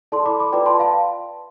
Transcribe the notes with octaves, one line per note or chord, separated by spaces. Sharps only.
E4 A4 D5 A5 C6
B5 D6
B5 D6
F4 B4 D5 G5 B5
A5 C6
F5 A5